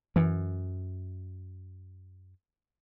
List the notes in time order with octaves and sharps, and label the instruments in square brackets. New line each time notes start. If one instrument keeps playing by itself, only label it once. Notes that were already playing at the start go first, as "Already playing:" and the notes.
[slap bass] F#2 [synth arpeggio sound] E3